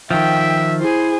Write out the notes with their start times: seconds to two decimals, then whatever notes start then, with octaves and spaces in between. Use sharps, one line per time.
0.11 D#3 F3 E5 G5
0.80 E4 G#4 C5